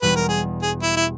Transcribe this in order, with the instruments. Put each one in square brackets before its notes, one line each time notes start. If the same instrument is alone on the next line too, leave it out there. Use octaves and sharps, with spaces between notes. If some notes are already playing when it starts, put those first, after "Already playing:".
[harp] E1 E2 B2 G3 [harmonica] B4
[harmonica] A#4
G#4
G#4
E4
E4